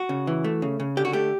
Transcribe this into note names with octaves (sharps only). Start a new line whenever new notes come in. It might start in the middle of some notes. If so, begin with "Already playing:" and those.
Already playing: F#4
C#3
E3
A3
C#3
C#3
D3 G4
F#4
A3 G4